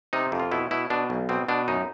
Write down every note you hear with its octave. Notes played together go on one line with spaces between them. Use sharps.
C3 D#4
F2
F4
B2 E4
B2 E4
B2 D4
B1
B2 C4
B2 D4
F#2 D#4